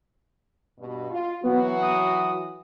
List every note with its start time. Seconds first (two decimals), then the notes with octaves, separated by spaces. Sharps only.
0.79 G2 B2
1.10 F4
1.43 E3 F#3 B3 F#4
1.82 D#6